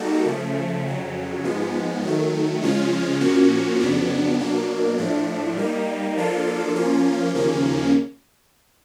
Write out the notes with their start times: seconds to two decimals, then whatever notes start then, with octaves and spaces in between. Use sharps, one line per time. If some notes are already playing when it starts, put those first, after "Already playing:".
Already playing: G3 A#3 D#4 F#4 A4
0.26 C#3 F3 A3
0.85 F2 C#3 F#3
1.44 G#2 F3 G#3 B3
2.03 D#3 F#3 A3
2.62 C#3 F3 G#3 C#4 F4
3.21 A#2 F3 A#3 C#4 F#4
3.80 F2 C#3 F#3 B3 D4
4.39 B2 F#3 A#3 D4
4.98 A2 F3 A3 D4
5.57 G3 A#3 D#4
6.16 F3 A#3 D4 F4 A4
6.75 F3 A#3 C#4 F4
7.34 D#2 C#3 F3 A#3 C#4